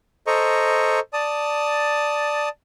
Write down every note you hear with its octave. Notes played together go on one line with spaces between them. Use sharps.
A4 C5 D#5 A#5 C#6
D5 A5 D#6